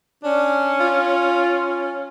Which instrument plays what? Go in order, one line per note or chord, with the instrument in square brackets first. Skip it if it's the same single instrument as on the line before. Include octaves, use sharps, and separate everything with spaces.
[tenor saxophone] C#4 [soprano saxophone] D4
[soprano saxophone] F4